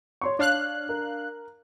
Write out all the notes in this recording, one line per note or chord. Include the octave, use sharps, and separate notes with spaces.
C#5 C6 C#6
D4 C#5 F5 F#6
A#4